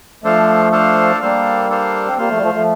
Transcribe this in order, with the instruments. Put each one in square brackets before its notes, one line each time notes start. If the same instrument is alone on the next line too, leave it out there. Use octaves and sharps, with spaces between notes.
[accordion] F3 A3 [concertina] D4 A4 C5 F5
[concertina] D4 A4 C5 F5
[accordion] G3 A#3 [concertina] D4 A4 C5 F5
[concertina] D4 A4 C5 F5
[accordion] C4
[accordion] G3 A#3 [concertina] F4 C5 F5
[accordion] F3 A3
G3
F3 A3
F3 A3